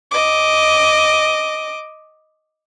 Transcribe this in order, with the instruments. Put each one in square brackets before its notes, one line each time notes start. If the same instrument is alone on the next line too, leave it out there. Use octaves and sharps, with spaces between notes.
[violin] D#5 D6